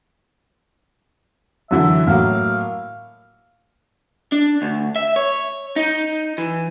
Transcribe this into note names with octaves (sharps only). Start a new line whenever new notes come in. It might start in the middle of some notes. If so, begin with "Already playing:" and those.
F#2 D3 E3 E5
A2 F#3 A#3 F5
D4
D2
E5
C#5
D#4
E3